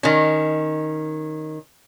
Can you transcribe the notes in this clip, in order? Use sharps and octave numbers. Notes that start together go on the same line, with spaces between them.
D#3 C#4